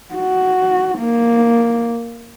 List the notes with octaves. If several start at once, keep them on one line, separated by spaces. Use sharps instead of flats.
F#4
A#3